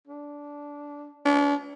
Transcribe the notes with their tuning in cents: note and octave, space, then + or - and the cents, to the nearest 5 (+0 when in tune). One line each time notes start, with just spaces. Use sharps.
D4 -15
D4 -40